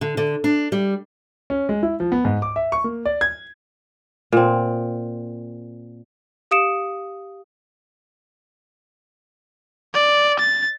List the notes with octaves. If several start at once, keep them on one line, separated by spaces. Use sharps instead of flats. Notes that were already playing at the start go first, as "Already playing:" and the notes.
D3
D3
D4
G3
C#4
G#3
E4
F3
B3
G#2
D6
E5
C#6
A#3
D5
G#6
A#2 C4
G4 F5 D#6 C#7 D7 E7
D5
A6